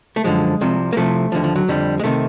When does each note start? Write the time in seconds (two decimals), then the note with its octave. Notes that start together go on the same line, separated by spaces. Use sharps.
0.16 A3
0.24 F#2 D3 F3 G#3
0.61 C2 C3 F3
0.93 A#3
0.97 C2 C3 F3 A3
1.32 F3
1.35 D#2 D3
1.44 F3
1.56 F#3
1.68 F2 D3 F3 G3
2.00 G#3
2.04 C3 D#3 A3